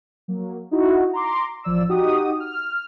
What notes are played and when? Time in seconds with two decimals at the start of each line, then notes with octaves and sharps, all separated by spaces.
0.28 F#3 A#3
0.71 D#4 E4 F#4
1.13 A#5 C6 D6
1.64 A1 F3 D5 E6
1.89 D#4 F#4 G4 D#6
2.40 F6